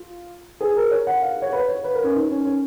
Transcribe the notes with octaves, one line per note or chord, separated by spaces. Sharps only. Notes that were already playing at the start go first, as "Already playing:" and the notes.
Already playing: F4
G#4
A#4
C#5
F#5
F5
C#5
B4
C#5
B4
A#4
C#4
D#4
C#4
C#4